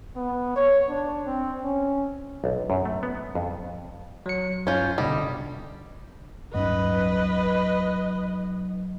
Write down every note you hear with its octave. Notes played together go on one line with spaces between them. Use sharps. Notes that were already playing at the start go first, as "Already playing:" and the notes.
B3
C#5
D4
C4
C#4
B1
F#2
A3
B3
F2
F#3 C#7
G2 C#4 F4 G6
C2 B2 D3 G3 D#5
D1 G2 F#3 C#4 D#4 B4 D#5